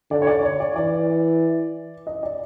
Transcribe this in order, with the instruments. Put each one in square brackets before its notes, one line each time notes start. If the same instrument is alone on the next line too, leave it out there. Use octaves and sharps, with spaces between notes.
[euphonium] D3 [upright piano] D5
[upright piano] C#5
D5
C#5
D5
[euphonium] E3 [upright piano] D5
[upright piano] D#5
D5